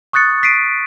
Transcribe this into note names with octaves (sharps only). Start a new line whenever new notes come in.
C#6 D#6 F#6 A6 C#7
B6 C7 D7 D#7